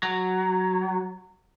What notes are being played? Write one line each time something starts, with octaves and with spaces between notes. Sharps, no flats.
F#3